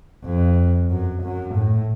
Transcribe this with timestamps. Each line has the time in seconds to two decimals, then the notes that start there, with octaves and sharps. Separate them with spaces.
0.25 F2
0.90 F#2
1.23 F#2
1.55 A2